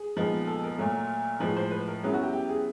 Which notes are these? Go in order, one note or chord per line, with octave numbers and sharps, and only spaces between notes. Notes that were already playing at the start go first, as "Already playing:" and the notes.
Already playing: G#4
A#2 F3 G#3 B3 D#4
A4
A#4
A#2 F#3 A3
A2 F3 G#3 B4
C5
B4
A#4
C#3 F#3 B3 E4 G#4
F#4
G4
G4
G#4